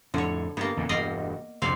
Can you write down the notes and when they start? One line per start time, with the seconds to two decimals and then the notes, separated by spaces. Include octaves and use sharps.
0.14 F2 A2 D3 C#5
0.57 G2 A#3 B3
0.77 E2 A#2 C#3
0.89 E1 G2 D5 D#5 F5
1.62 C2 F2 D3 C4 D5 F5